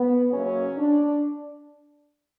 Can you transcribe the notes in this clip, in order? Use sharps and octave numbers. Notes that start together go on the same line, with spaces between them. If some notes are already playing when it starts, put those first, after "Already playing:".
Already playing: B3
F#2 C#3 F#3 A#3 C#4
D4